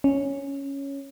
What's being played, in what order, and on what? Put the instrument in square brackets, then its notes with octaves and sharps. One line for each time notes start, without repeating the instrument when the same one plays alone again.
[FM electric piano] C#4